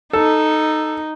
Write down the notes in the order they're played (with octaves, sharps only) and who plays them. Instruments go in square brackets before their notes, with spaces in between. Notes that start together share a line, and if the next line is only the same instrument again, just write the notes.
[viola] D#4 [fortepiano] A4